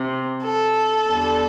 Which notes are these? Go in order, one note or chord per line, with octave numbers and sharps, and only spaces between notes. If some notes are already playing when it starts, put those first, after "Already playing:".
Already playing: C3
A4
E2 D3 G3